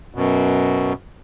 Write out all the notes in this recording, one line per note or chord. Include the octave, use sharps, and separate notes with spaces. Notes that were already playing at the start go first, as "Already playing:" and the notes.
F#2 B2